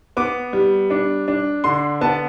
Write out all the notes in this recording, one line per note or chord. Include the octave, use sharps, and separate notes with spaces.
B3 D6
G3
D4
D4
D3 C6
B3 A5